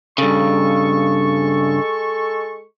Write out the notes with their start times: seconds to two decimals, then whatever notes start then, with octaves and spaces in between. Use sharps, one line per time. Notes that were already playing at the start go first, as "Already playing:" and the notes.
0.18 G2 C#3 G#3 A4 C#6